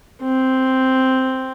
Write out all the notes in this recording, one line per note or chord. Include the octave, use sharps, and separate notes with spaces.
C4